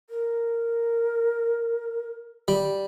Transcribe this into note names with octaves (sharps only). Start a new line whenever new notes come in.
A#4
G3